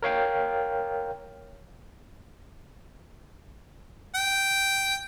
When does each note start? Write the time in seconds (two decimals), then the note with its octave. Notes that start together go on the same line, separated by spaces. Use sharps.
0.03 A#4 C#5 F5 G5
4.15 G5